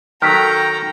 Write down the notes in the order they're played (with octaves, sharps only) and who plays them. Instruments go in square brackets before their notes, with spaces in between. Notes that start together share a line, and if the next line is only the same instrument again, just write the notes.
[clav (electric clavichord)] D#3 F#3 [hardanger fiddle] A4 A#5 [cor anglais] G5 [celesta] F6 B6